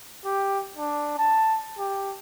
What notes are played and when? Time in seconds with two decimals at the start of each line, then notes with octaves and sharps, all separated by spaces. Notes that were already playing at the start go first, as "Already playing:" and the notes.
0.25 G4
0.77 D4
1.18 A5
1.79 G4